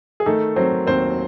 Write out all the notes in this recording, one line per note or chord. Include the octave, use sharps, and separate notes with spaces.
G#4
D#3 A3 A4
F#3 C4 C5
D#2 C4 C5